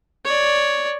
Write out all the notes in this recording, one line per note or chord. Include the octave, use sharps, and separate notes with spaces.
C#5 D5